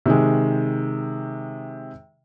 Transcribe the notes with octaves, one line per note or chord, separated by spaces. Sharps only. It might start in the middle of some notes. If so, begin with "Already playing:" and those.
C3 D#3 G#3